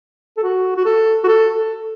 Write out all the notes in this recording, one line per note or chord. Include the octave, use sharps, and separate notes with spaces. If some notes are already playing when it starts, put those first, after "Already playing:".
A4
F#4
F#4
A4
F#4
A4
A4